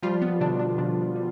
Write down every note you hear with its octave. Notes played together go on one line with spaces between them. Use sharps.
F3 G3 F4
B3
B2 D3 D4
D3 D4
B2 D3 D4
G3